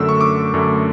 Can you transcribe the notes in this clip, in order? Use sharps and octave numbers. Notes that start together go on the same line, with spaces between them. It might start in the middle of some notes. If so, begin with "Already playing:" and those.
Already playing: F#2 D3 A3 E6
C#6
D6
F#2 D3 A3